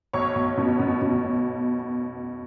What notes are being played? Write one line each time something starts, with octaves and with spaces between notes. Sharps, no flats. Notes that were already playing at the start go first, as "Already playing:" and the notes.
B1 C#5 C#6
B1
B2
B2
B2
B1